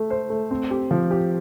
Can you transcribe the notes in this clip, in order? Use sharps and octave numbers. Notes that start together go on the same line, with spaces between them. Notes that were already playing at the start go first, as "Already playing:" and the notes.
Already playing: A3
C5
A3
C4
G4
F3
G4